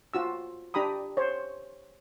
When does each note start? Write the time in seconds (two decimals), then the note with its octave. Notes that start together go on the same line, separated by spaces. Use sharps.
0.14 F4 F#4 E6
0.74 D4 G4 A#5 B5 D#6
1.17 C5 C#5